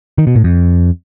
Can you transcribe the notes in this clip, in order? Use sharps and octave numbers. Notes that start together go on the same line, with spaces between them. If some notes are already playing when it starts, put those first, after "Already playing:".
D#3
B2
A2
F2